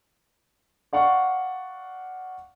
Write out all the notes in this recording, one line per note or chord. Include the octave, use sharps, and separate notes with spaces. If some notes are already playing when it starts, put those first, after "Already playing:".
D5 F5 F#5 C#6